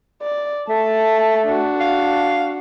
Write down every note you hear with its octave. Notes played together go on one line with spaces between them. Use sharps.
D5
A3 A5
D4 F#4
F5